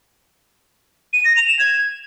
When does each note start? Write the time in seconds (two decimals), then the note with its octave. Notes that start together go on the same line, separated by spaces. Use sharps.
1.13 D#7
1.25 A#6
1.36 F7
1.48 E7
1.59 G#6